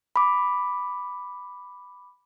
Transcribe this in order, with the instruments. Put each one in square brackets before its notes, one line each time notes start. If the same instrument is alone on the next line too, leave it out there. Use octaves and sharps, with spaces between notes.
[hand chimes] B5 D6